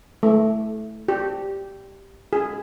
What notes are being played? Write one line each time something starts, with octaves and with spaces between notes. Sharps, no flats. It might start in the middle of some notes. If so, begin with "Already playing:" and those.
A3
G4
G#4